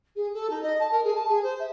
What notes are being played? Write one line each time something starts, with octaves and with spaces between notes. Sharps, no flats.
G#4
A4
D#4
D#5
A5
A#4
G#4
A5
G#4
C5
E5